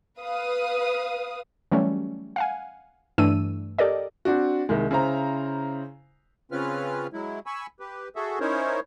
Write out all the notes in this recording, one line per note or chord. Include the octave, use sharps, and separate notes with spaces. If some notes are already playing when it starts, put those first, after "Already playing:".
B4 F5 D#6
E3 F#3 G3 A3 C#4
F5 F#5 G#5
G2 E3 A3 D4 E6 D#7
G4 A4 A#4 D5 D#5
C4 D4 F#4
C2 D#3 G#3
C#3 E4 C5 A#5
C#3 C4 C#4 F4 B4 F6
F#3 G#3 E4
G#5 B5 C#6 E6
G4 B4
F#4 G#4 A4 E5
C#4 D#4 E4 A#4 C5 C#5